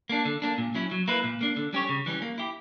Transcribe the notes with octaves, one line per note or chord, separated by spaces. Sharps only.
A#3 D4
D3
A#3 D4
A#2
F#3 C#4 E4
F#3
A#3 E4 B4
A#2
A#3 D4
D3
G3 C#4 G4 C#5
C#3
E3 G3 C#4
A#3
E4 G4